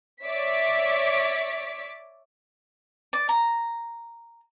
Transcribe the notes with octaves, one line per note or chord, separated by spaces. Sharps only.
C#5 D5 E5 D6 B6
D5
A#5